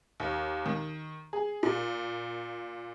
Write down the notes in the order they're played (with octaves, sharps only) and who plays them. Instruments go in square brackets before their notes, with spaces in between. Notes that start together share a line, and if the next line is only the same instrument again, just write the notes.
[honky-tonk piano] D#2
D#3
G#4
A#2